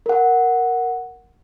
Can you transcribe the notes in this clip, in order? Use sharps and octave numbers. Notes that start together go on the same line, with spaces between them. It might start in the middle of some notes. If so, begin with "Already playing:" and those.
A#4 F#5